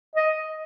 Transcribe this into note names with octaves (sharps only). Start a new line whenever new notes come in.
D#5